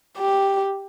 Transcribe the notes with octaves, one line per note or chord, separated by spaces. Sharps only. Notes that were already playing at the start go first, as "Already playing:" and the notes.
G4